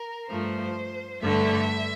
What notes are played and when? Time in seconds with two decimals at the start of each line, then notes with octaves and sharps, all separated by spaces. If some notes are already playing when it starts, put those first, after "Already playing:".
Already playing: A#4
0.28 G2 F3 A3 C5
1.23 G2 D3 A3 E5